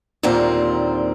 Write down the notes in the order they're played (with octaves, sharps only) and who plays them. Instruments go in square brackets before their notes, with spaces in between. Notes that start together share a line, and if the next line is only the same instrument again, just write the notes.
[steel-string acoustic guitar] D#2 A#2 D3 C4 A#4